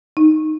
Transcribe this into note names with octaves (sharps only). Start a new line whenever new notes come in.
D#4